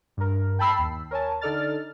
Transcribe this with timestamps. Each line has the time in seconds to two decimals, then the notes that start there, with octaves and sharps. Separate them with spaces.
0.17 G2 A#4
0.59 G5 A5 B5 E6 C7
0.79 D#2
1.11 A#4 C#5 G#5 A5
1.41 D3 D#4 A4 D5 F6 A6